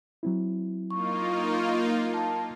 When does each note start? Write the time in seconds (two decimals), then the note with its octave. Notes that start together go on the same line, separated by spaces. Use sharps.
0.23 F#3 C4 E4
0.91 A#3 D#4 F4 C#6
2.14 A5